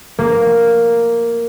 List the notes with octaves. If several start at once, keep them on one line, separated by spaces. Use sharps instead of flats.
A#3